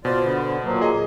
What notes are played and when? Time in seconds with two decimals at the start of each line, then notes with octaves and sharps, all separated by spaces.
0.05 B2 F4 C5 D5
0.22 D3 B3
0.64 A#2 F#3 A#3
0.81 G#4 D#5